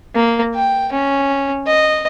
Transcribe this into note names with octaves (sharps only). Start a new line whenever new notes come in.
A#3
G5
C#4
D#5